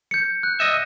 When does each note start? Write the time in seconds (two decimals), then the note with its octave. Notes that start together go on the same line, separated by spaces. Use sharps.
0.11 G6 C#7
0.43 F#6
0.60 D#5 E5